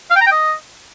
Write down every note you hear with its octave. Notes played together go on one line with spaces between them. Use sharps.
F5
G5
A#5
G5
D#5